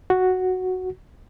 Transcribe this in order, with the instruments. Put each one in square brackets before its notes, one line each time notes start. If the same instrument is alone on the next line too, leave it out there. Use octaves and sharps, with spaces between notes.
[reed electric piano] F#4